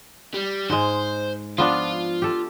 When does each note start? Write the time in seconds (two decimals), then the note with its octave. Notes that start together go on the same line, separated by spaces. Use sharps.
0.34 G3
0.70 G#2 G#3 C5
1.58 F3 B3 D4 F4
2.22 G4 A4